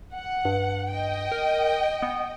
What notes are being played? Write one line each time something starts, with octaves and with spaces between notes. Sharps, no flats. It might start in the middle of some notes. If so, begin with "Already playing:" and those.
F#5
G2
D#5 G5
A#4
B3